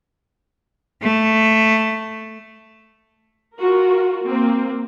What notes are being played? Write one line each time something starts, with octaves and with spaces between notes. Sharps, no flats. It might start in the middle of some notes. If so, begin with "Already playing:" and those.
A3
F4 F#4 A#4
A#3 C4